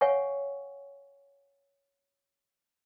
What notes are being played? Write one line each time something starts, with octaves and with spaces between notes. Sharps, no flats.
C#5 F5 F#5 G#5 C#6